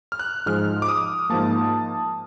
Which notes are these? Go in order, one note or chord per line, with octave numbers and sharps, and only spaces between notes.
F6
F#6
G#2 F3 G#3 F6
D6
D#6
G#2 F3 A#3 A5